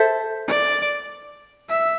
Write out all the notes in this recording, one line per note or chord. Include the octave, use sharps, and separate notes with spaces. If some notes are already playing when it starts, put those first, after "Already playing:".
Already playing: A4 C5 E5
D5
E5